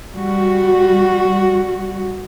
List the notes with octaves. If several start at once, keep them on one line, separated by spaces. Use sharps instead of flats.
G3 F#4